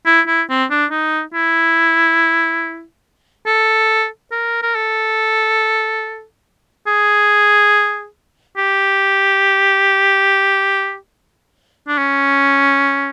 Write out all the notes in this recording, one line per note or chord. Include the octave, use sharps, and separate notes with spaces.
E4
E4
C4
D4
D#4
E4
A4
A#4
A#4
A4
G#4
G4
D4
C#4